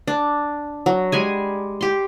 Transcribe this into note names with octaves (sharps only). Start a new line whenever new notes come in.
D4
F#3
G3 G#3 G#5
G4 C6